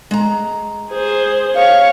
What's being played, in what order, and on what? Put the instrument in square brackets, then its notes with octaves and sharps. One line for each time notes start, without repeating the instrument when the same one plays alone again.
[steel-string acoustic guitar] G#3 A#5
[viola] G#4 C5
[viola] C#5 [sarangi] F5